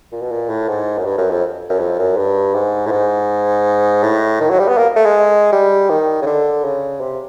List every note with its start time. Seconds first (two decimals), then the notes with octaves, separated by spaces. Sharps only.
0.12 A#2
0.22 B2
0.31 A#2
0.50 A2
0.68 G#2
0.98 F#2
1.05 G2
1.18 F#2
1.31 F2
1.69 F#2
1.79 F2
1.99 F#2
2.17 G2
2.54 G#2
2.86 A2
2.92 G#2
4.03 A2
4.40 D#3
4.50 F#3
4.59 G3
4.68 B3
4.78 A#3
4.96 A3
5.06 G#3
5.52 G3
5.90 D#3
6.22 C#3
6.26 D3
6.64 C#3
7.01 C3